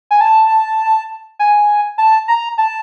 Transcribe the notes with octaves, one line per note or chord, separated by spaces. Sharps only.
G#5
A5
G#5
A5
A#5
A5